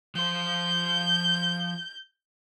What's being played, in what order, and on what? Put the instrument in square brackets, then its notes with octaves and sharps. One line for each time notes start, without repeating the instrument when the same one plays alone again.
[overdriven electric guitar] F3 C5 [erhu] G6